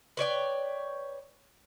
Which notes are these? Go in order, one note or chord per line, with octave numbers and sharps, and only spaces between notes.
B4 C#5 D5 G5